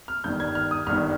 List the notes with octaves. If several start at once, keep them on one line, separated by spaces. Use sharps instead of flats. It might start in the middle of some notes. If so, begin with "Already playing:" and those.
F6
G1 G2 D#3 G6
G#6
F6
D#6
G1 G2 D#3 F6